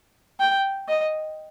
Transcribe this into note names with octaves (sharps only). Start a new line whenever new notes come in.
G5
D#5